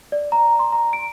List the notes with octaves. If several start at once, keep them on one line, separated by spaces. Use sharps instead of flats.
D5
A#5
C6
A#5
D7